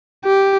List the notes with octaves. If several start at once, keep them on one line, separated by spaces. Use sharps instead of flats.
G4